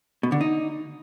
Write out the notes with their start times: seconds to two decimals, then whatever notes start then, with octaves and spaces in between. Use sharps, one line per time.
0.23 B2
0.32 D3
0.41 D#4